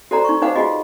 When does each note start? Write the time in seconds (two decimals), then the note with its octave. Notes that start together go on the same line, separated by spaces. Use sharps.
0.11 F#4 A4 C5 D5 A#5
0.24 D#4 C#6
0.42 D#4 B4 C5 F5 F#5 D6
0.55 F4 F#4 G#4 D#5